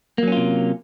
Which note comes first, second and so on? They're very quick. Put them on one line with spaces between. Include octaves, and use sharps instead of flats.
A#3 F#3 C#4 F4 C3